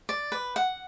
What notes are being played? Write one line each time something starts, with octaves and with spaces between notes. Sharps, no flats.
D5
B4
F#5